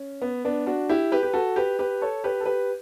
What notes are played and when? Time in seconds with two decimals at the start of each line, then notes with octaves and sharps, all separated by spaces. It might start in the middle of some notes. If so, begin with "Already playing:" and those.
Already playing: C#4
0.22 B3
0.45 B3 D4
0.66 D4 F#4
0.89 E4 G4
1.12 G4 B4
1.23 G4
1.34 F#4 A4
1.56 G4 B4
1.79 G4 B4
2.02 A4 C#5
2.24 G4 B4
2.40 A4
2.46 G4 B4